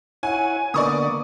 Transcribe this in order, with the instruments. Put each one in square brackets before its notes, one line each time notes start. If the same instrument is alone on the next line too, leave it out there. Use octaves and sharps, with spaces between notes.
[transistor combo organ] E4 C#5 F#5 [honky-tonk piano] G#5
[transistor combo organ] D3 A#3 B3 [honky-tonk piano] D5 C#6 D#6